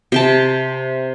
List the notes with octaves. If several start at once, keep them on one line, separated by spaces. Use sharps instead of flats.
C3 G5 A5